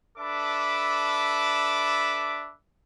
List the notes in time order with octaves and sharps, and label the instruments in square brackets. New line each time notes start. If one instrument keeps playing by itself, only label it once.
[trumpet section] D4 A4 B4 E5 B5 D6